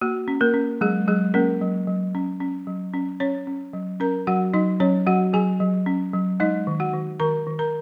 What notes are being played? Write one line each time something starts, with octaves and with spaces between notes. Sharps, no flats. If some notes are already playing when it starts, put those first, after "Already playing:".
A#3 F#4
C#4
A#3 A#4
C#4
F#3 G#3 G#4
F#3 G#3 G#4
A#3 C#4 A#4
F#3
F#3
C#4
C#4
F#3
C#4
C#4 C#5
C#4
F#3
C#4 A#4 A#5
F#3 F#4 F#5
F#3 D#4 D#5
F#3 C#4 C#5
F#3 F#4 F#5
F#3 G#4 G#5
F#3
C#4
F#3
G#3 D#4 D#5
D#3
F#4 F#5
D#3
D#3 A#4 A#5
D#3
A#4 A#5